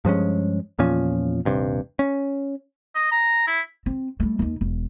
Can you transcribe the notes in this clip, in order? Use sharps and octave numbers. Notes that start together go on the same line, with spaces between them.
G2 F3 G#3 C#4
E2 A#2 F3 C#4
D#1 G2 C3
C#4
D#5
A#5
E4
C4
G3 A3
D#2 D#4
E1